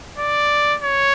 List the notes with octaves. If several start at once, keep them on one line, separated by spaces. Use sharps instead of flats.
D5
C#5